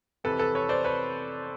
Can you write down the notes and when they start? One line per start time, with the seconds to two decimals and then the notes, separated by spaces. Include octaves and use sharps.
0.24 F2 C3 E3 A4 B4
0.39 A4 B4
0.55 B4 C#5
0.69 C5 D5
0.84 B4 C#5